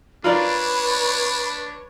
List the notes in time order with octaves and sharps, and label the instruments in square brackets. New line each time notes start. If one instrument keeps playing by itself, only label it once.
[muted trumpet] D4 [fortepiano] F4 A#4 D5 [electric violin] B4 C#5 [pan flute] B5